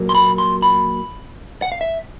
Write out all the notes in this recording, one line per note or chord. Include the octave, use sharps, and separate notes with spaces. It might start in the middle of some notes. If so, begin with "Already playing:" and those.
Already playing: A#2 F#3 A#3
C6
B5
C6
B5
F#5
F5
E5